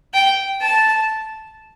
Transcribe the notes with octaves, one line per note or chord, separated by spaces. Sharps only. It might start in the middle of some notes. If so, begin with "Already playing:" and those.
G5
A5